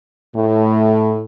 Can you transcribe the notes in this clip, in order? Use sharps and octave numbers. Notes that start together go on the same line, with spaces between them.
A2